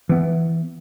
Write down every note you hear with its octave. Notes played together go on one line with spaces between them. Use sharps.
E3 B3